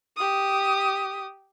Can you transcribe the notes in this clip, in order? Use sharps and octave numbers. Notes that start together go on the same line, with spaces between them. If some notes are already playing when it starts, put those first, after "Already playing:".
G4 D#6